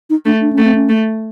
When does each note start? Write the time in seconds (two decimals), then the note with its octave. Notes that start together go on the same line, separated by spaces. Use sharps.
0.10 D#4
0.25 A3 D4
0.41 D4
0.53 C#4
0.58 A3
0.65 C4
0.75 C#4
0.89 A3